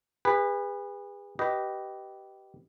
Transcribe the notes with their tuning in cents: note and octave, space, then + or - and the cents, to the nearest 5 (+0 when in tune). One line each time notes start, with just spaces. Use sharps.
G#4 -40 B4 +0
G4 -20 B4 +0 D#5 +0